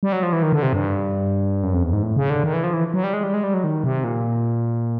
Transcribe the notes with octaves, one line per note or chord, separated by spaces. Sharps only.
G3
F#3
F3
E3
D#3
D3
C3
G2
F#2
F2
E2
G#2
A2
C#3
D3
D#3
E3
F3
E3
F#3
G3
G#3
G3
G#3
G3
F#3
D#3
C3
A#2